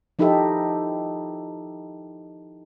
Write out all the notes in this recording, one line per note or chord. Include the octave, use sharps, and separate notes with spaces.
F3 D#4 E4 G4 A4 E5